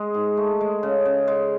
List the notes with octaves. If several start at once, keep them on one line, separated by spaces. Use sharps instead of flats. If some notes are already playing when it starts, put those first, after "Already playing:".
Already playing: G#3 G#4
G#2
A3
G#3
C#3
C#3
G#3